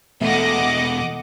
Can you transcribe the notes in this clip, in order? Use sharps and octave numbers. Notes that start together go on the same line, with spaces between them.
E2 B2 A3 D#5 F#5 D6